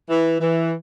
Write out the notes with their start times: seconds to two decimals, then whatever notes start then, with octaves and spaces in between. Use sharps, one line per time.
0.09 E3
0.40 E3